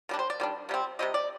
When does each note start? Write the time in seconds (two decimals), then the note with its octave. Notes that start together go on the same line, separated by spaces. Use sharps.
0.09 D#3 G3 D4
0.19 C5
0.30 D5
0.40 D#3 G3 D4
0.69 C3 G3 C4
0.99 C3 G3 C4 D#5
1.14 D5